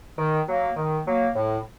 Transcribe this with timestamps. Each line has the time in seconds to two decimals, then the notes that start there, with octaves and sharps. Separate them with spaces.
0.18 D#3
0.48 F#3 A#3
0.77 D#3
1.06 F#3 A#3
1.36 A2